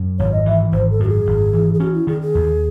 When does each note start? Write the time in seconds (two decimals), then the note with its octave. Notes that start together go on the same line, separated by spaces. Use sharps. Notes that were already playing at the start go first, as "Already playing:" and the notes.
Already playing: F#2
0.19 G#1 C#5
0.32 D#5
0.46 E3 E5
0.72 G#1 C5
0.90 A4
1.00 F#2 F#4
1.09 G#4
1.27 G#1
1.53 E3
1.74 G#4
1.80 C#4 F#4
1.93 E4
2.07 D#3 G#4
2.22 G#4
2.35 D#2